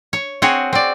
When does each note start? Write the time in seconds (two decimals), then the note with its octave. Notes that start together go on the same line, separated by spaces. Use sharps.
0.13 C#5
0.42 C4 F#4 G#4 C#5
0.73 C4 D5